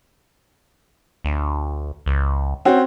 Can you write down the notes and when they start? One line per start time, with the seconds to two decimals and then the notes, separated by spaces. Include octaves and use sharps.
1.25 D2
2.06 C#2
2.65 C4 C#4 F#4